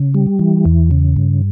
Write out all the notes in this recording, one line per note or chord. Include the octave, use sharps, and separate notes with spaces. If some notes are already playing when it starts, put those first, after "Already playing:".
Already playing: C#3
G3
E3
E2
C#3
G2